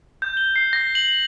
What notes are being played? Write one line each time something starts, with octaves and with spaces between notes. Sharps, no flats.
G6
G7
C7
A#6
F#7